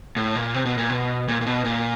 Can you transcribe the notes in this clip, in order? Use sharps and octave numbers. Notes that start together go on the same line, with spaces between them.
A2
A#2
C3
B2
A#2
B2
A#2
A#2
B2
A#2